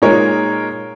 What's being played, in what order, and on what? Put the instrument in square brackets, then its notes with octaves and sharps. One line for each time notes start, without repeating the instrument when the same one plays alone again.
[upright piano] A#2 G#3 D#4 A#4 C#5